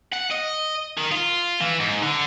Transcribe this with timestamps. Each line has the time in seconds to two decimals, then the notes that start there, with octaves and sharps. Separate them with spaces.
0.13 F#5
0.32 D#5
0.97 D#3
1.11 F4
1.61 E3
1.80 G#2
2.02 D3